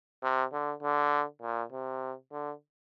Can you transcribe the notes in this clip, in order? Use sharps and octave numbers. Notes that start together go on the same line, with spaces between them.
C3
D3
D3
A#2
C3
D3